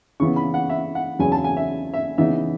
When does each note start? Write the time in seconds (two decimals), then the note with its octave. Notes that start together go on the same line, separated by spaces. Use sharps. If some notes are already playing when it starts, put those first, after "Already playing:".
0.20 C#3 E3 B3 C#6
0.36 B5
0.54 F#5
0.70 E5
0.95 F#5
1.19 E2 C#3 F#3 G#5
1.32 A5
1.44 G#5
1.57 E5
1.94 E5
2.18 C#3 E3 B3 D#4 E5